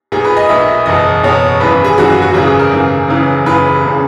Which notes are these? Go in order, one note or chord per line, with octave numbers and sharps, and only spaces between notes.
B1 A#2 G#4
B4
D#5
B1 A#2 E5
F#1 E2 B2 D#5
F#1 E2 B2 C#5
G#1 F#2 E3 B4
G#4
G#1 F#2 E3 F#4
F#4
F#4
G#1 F#2 C#3 E3 G#4
G#4
A#4
G#1 F#2 C#3 E3
F#1 F#2 C#3 E3
F#1 F#2 C#3 E3 B4
E1 C#3